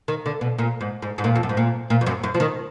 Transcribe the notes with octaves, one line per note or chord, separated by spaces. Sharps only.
D#3
D3
B2
A#2
G#2
G#2
G#2
A#2
F2
F#2
G#2
A#2
A#2
F2
F#2
F#2
F3
D#3